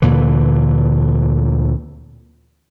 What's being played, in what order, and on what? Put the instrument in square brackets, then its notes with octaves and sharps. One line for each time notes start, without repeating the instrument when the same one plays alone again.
[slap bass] D2 A#2 D3 E3